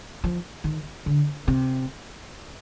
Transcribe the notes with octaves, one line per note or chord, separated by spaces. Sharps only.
F3
D#3
D3
C3